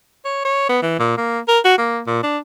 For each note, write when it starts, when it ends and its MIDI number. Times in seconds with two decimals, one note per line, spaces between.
0.25 0.40 73
0.45 0.67 73
0.69 0.81 59
0.82 0.95 52
0.99 1.17 46
1.17 1.39 58
1.48 1.59 70
1.65 1.76 66
1.78 2.00 58
2.07 2.21 46
2.23 2.38 62